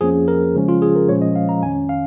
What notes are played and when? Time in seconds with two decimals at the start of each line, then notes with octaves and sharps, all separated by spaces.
0.01 F2 F3 A#3 C#4 G#4
0.28 A#4
0.54 C#3 F3 G#3 C#4
0.68 F4
0.82 G#4
0.96 A#4
1.09 A#2 F3 G#3 C#4 C#5
1.22 D#5
1.36 F5
1.49 A#5
1.62 F2 D#3 C#4 G#5
1.89 F5